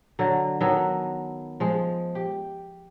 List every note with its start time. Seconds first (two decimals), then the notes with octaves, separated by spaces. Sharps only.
0.19 D3 F#3
0.60 D#3 F#3 B3 A4
1.60 F3 G#3
2.15 G4